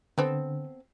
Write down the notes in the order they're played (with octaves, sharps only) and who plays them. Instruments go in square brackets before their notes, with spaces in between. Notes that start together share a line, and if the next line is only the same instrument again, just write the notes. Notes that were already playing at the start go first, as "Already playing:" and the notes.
[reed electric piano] D3 [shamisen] B3 C4 A4